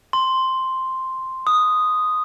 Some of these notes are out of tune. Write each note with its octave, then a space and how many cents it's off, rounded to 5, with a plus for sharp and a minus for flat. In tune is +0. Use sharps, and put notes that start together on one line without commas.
C6 +0
D#6 -5